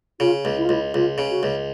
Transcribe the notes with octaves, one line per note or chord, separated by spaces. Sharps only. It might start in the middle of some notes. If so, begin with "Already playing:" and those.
C#3 F4
C#2
E4
F4
C#2 E4
C#2 F4
C#3
F#4
C#2